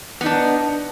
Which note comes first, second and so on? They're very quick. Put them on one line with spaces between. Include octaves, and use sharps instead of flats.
B3 D#4 D4